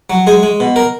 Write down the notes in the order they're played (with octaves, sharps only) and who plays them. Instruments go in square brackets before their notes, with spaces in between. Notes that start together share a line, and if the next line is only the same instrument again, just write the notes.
[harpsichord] F#3
G#3 G#4
G#3
B2
A#4